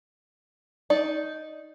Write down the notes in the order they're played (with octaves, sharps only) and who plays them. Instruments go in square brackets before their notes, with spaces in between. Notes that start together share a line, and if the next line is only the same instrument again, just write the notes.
[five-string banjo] D#4 D5